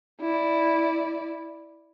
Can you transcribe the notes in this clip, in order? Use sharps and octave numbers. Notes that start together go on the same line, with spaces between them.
E4 D5